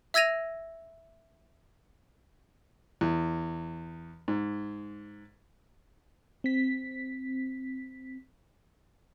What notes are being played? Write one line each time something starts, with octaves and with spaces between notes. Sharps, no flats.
E5 E6 G#6 A#6 D#7 F7
E2
G#2
C4 B6